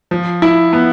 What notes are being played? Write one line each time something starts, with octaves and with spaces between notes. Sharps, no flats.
F3
E4
B3